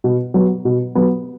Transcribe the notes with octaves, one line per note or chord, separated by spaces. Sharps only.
B2
F#3 B3
B2
F#3 B3